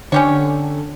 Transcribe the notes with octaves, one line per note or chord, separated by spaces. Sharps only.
D3 C#4 G4 C#5